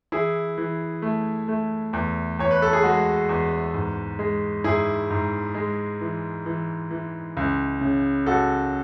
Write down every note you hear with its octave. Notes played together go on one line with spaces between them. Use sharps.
E3 E4 G#4
E3
A3
A3
E2
E2 C#5
B4
A4
G#4
G#3 F#4
E2
G#2
G#3
G#2 E4 G#4
G#2
G#3
E3
E3
E3
C#2
C#3
C#2 F#4 A4